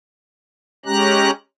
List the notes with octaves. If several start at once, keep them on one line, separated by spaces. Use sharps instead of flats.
G#3 C#4 G4 A#5 F#6